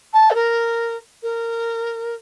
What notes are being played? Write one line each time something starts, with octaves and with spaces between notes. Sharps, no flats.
A5
A4
A#4
A#4